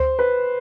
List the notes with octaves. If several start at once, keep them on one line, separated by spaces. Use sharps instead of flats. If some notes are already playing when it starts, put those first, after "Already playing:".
Already playing: D2 C5
B4